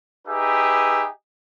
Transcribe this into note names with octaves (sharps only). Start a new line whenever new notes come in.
D#4 G4 G#4 B4 E5